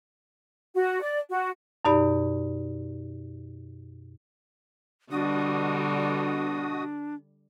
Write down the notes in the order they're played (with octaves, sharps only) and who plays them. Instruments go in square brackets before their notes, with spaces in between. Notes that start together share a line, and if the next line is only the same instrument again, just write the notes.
[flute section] F#4
D5
F#4
[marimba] F#2 B2 D#4 G4 D5 B5
[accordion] B2 F#4 D#6 [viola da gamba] D3 G3 [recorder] D4